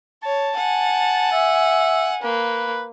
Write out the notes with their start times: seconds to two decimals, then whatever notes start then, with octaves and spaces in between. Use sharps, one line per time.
0.24 C#5 A5
0.57 F#5 G#5
1.32 E5
2.23 A#3 B4